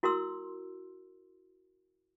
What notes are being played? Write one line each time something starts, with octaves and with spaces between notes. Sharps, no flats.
E4 F#4 A#4 C6 E6